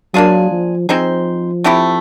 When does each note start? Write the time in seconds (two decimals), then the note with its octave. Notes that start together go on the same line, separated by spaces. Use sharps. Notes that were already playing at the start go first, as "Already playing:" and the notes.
0.14 F#3 A#3 D4 F4 G#4
0.51 F3
0.89 F3 C4 D#4 G#4 C5
1.64 A3 C4 E4 G4